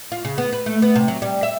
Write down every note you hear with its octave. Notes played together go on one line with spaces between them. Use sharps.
F4
C#3
B3
B4
A3
B3
C3
F#3
G3
E5